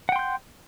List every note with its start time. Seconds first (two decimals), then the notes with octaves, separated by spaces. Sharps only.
0.09 F#5
0.12 G5
0.16 C6
0.19 G6